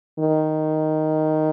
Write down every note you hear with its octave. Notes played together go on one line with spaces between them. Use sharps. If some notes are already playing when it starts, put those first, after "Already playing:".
D#3